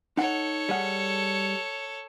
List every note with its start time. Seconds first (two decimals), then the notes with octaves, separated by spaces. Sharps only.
0.17 D#4 A4 C#5 F#5
0.69 G3 G#4 F#5